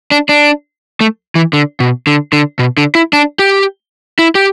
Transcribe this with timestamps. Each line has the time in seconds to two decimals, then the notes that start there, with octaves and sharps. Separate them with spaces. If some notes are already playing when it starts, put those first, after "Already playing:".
0.11 D4
0.29 D4
1.01 A3
1.35 E3
1.53 D3
1.80 B2
2.07 D3
2.33 D3
2.59 B2
2.77 D3
2.95 E4
3.13 D4
3.39 G4
4.19 E4
4.35 G4